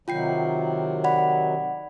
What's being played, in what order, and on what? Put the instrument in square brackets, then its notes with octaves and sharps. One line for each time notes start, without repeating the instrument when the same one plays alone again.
[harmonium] C3 D#3 F#3 [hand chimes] F4 G5 C7
[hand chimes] D5 B5 [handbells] F#5